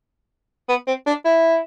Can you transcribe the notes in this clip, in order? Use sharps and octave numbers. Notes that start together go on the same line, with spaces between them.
B3
C4
D4
E4